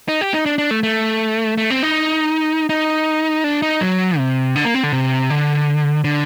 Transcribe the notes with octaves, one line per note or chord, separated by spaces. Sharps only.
D#4
G4
D#4
D4
D4
A3
A3
A3
C4
D#4
D#4
D4
D#4
F#3
C3
D3
A#3
C4
D3
C3
D3
D3